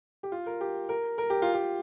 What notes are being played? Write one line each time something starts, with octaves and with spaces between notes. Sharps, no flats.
G4
F4
A#4
G4
A#4
A#4
G4
F4
G4